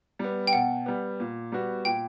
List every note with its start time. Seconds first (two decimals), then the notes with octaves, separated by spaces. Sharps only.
0.19 G3 B3
0.47 G5
0.53 B2 F#5
0.86 G3 B3
1.20 A#2
1.52 G3 B3 F#4
1.85 A#2 G5